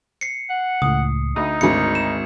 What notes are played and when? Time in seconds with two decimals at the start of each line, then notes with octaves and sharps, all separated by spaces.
0.21 C7 C#7
0.50 F#5
0.82 C#2 A2 D#6
1.36 D2 D#4 D#6
1.61 G#1 D2 C#7
1.95 E7